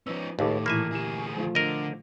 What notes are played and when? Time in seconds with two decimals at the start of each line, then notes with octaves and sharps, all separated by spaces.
0.07 F3 C#4 D#4 B4 E6
0.39 C#2 A2 D#3 G4 A4 F5 D6
0.66 A#2 E3 A#3 E4 E5 G#5
0.92 D2 G4 G#4 E7
1.37 F3 A3 F4
1.55 D3 A#4 D#5